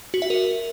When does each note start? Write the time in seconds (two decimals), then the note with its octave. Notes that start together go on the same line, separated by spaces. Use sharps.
0.14 F#4
0.22 E5
0.30 A#4